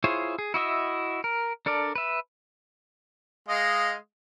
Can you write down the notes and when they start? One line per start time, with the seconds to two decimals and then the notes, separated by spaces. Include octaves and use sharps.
0.04 E4 F4 G#4 C5 C#5
0.39 G#4
0.54 E4 F#4 D#5 E5
1.24 A#4
1.66 D4 A4 A#4 D5
1.95 B4 E5
3.48 G#3 D#5 F5